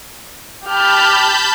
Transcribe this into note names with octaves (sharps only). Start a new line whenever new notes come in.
G4 A5 B5 F6 G6